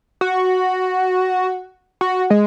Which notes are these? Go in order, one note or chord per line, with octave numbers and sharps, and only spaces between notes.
F#4
F#4
G#3